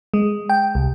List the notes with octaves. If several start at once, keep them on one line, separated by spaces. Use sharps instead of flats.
G#3
G5
C2